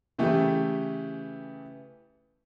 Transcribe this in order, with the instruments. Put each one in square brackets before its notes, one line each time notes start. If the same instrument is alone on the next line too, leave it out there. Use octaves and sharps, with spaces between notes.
[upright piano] C#3 E3 A3 G4